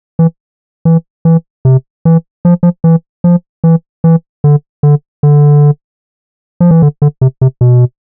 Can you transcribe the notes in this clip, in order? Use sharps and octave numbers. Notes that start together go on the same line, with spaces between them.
E3
E3
E3
C3
E3
F3
F3
E3
F3
E3
E3
D3
D3
D3
F3
E3
D3
D3
C3
C3
B2